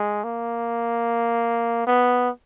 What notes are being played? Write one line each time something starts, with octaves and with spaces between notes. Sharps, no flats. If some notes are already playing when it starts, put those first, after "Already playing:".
Already playing: G#3
A#3
B3